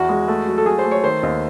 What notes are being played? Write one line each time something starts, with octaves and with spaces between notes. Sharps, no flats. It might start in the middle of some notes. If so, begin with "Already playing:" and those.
Already playing: E2 F#4
G#3
A3
F#3
A4
F#3 G#4
C5
A3
C#5
D#3 C5
D#2